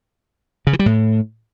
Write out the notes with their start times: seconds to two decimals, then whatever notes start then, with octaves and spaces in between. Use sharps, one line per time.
0.67 C#3
0.73 E3
0.79 G3
0.86 A2